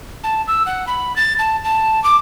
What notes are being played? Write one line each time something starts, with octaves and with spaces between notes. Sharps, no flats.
A5
E6
F#5
B5
A6
A5
A5
D6